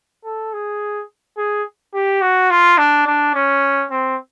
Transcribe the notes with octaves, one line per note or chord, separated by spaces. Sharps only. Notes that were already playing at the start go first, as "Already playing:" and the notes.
A4
G#4
G#4
G4
F#4
F4
D4
D4
C#4
C4